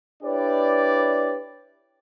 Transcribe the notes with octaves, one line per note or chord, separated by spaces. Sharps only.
D4 E4 G4 B4 C#5 D5